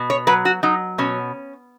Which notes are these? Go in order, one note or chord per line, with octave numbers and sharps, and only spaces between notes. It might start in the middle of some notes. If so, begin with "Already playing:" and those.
Already playing: B2
C#5
F#3 B4
F#4
F#3 D#4
B2 C#4